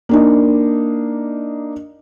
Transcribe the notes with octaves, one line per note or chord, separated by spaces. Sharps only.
A#3 D4 D#4